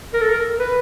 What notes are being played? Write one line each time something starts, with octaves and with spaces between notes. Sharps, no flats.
A#4
A4
A#4
B4